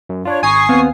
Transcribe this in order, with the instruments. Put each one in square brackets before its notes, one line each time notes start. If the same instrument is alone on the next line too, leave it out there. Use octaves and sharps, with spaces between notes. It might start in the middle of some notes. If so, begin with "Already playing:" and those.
[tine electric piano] F#2
[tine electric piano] D4 F4 [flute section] C#5
[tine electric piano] G#1 A#5 [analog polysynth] G#5 D#6 C7 [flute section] C#6
[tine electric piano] D#2 F5 [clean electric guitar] B3 C4